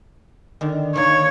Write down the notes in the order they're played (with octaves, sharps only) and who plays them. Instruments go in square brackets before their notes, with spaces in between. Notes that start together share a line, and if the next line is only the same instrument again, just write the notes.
[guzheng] D3 D#3
[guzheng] D#3 A#3 [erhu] C#5